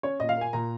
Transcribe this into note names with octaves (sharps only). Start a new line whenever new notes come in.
C#4 C#5
A#2 D#5
F5
A#3 G#5
A#2 A#5